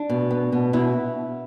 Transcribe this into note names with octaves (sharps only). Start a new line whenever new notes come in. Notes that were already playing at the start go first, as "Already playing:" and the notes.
Already playing: D4
B2
B3
B2
B2 E4